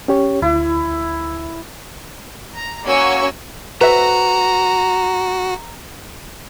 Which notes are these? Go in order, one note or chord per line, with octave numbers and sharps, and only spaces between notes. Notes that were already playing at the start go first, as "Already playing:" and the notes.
C#4 G4 C#5
D2 E4
A#5
A#3 C#4 F#4 G#5 C#6 E6
F#4 B4 E5 A#5